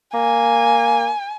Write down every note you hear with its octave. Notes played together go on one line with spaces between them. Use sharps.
A#3 G#5